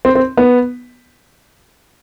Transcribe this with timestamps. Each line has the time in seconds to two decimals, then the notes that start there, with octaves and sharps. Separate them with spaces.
0.05 C4
0.15 C4
0.37 B3